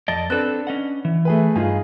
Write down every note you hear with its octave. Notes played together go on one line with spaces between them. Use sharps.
F2 D5 D#5 A5
C4 D4 A4 B4 F#6
C#4 D#5 F#5
E3
A3 G#4 B4
G2 D#4 F4 G#4